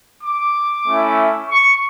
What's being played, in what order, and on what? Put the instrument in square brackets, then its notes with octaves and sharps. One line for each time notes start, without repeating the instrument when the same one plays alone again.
[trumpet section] D6
A3 C#4 E4
C#6